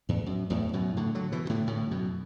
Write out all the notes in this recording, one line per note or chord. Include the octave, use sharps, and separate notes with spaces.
E2 A2
F#2
E2 A2
F#2 B2
A2 D3
D3 F#3
B2 E3
B2
A2 D3
A2 D3
F#2 B2